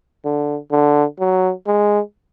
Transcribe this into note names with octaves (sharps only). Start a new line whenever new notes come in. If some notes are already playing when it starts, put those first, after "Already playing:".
D3
D3
F#3
G#3